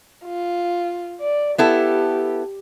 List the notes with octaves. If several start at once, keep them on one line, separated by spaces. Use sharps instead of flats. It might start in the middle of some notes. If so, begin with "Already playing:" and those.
F4
D5
B3 E4 G4 A4